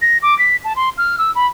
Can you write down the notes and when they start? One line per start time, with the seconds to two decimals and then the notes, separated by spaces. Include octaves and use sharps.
0.02 A#6
0.23 D6
0.39 B6
0.65 A5
0.76 C6
0.98 F6
1.18 E6
1.35 B5